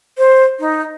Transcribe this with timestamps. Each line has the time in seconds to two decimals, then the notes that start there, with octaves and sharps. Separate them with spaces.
0.18 C5
0.60 D#4